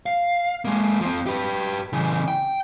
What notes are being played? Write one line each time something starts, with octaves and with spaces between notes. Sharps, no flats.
F5
G#3 A#3
F3 C4
G4 B4
C#3 E3
G5